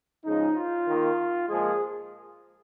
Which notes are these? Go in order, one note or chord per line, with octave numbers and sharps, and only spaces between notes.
C#3 F3 G#3 D#4
F4
D#3 A#3
A#2 F3 G#3 G#4